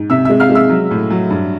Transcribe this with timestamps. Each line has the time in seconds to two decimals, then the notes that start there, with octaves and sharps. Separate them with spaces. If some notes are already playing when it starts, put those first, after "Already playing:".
Already playing: G#2
0.10 C3 E5 E6
0.25 G#3 E5 E6
0.40 F5 F6
0.50 G#3
0.55 E5 E6
0.69 F#3
0.91 A2
1.10 F#3
1.30 G2